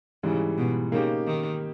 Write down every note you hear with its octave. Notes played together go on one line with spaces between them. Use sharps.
G#2 C#3 E3 G3
B2
C#3 A#3 D#4 G4
D#3